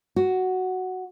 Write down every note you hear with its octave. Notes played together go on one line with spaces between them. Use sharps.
F#4